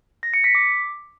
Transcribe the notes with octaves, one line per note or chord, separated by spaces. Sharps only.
A#6
C#7
B6
D6